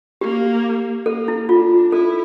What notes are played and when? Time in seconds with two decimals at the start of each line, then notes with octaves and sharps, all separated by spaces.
0.21 A#3 G4
1.06 A#3 A4
1.28 E4
1.49 D4 F4
1.92 E4 A4